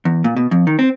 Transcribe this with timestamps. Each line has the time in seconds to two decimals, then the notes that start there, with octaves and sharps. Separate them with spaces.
0.05 E2
0.24 A#2
0.37 B2
0.51 F2
0.67 D#3
0.79 C4